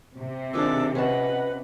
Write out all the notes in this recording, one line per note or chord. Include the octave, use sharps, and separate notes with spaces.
C3
D#3 F3 G#3 D4 D6 E6
C#4 B4 D#5 F#5 A5